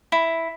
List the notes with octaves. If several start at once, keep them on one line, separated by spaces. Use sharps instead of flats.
E4